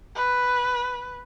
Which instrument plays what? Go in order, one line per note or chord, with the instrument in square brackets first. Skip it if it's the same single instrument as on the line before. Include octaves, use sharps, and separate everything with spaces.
[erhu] B4